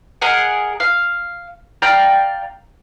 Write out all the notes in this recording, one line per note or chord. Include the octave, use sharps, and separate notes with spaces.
G#4 A#4 D#5 F#5
F5
D5 F5 G5 A#5